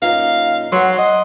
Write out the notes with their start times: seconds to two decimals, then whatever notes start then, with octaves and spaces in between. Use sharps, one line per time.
0.02 F#2 A#2 D#4 F5
0.72 F#3 C#5 F#5 C6
0.98 D#5